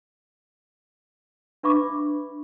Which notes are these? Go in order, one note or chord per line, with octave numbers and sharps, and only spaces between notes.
D4 B4 E5 B5 C#6 D6